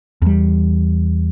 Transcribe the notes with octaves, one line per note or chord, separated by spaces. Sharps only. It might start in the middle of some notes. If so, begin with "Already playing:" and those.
E2 G3